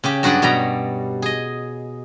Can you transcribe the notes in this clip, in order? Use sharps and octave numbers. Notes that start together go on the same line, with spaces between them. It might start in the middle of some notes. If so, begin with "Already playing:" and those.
C#3 C#4 G4
G2 F#3 F#4 G#4 D5 F#5
B2 G3 C#5 A#5
G#4 D#5